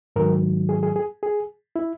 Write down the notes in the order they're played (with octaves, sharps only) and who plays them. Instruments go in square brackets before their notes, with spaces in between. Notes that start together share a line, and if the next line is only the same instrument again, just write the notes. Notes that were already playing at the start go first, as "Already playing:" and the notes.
[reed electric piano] G#2 D#3 F#3 A#4
G#4
G#4
G#4
G#4
E4